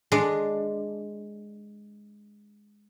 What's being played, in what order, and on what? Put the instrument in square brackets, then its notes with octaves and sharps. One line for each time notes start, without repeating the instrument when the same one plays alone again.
[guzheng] G#3 D4